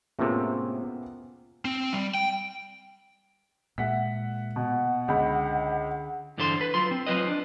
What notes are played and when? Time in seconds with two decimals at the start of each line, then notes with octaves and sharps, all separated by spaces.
0.19 A2 C3 A#3 B3 C#4 F4 G#4 E5
1.65 C4
1.93 G3
2.15 G5
3.78 A#2 G#3 E5 F#5 B6
4.56 B2 F#5
5.08 C#2 D3 B5
6.38 G2 D3 E3 A4 C5 C6
6.61 B4
6.74 F#3 F4 C6
6.91 C4
7.07 F#3 F4 B4 C5 D#5
7.28 D4